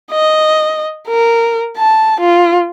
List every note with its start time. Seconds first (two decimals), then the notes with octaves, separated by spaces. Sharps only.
0.11 D#5
1.08 A#4
1.77 A5
2.20 F4